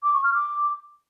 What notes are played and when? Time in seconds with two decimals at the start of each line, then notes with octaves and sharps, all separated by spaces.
0.03 D6
0.13 C#6
0.23 F6
0.34 D6